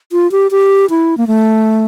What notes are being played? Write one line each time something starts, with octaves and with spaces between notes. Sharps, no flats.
F4
G4
G4
E4
A#3
A3